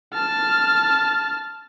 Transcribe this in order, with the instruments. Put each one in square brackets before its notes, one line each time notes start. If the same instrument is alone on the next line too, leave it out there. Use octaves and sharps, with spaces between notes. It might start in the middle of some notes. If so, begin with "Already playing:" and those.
[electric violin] A5 F6